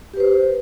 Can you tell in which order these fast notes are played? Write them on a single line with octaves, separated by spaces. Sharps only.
G4 B4 C5